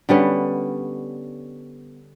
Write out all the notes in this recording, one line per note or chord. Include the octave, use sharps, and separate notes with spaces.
D3 G3 B3 C#4